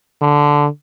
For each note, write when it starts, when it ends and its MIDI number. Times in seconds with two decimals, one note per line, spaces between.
0.22 0.68 50